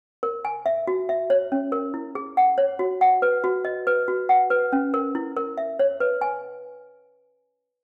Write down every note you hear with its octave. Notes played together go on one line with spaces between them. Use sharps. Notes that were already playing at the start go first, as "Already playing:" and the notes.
A#4
G#5
E5
F#4
E5
C#5
C#4
A#4
E4
G#4
F#5
C#5
F#4
F#5
B4
F#4
D#5
B4
F#4
F#5
B4
C#4
A#4
E4
A#4
E5
C#5
B4
G#5